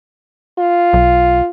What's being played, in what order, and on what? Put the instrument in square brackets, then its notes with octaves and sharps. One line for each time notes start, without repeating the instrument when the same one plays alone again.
[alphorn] F4
[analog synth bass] B1